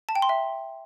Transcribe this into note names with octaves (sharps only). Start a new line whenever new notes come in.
A5
G5
C6
E5